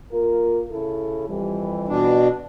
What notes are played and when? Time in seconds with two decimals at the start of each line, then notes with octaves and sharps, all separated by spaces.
0.12 A#3 F4 A#4
0.71 C#3 E4 A4
1.29 F2 E3 G3
1.88 B2 D4